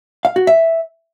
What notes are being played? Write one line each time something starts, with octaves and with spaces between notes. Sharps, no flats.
F5
F#4
E5